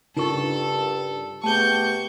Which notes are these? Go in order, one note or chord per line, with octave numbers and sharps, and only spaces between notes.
G2 C#3 D4 D#4 F4 A4 A#4 C#6
C3 A3 B3 G4 G#4 A5 C#6 G6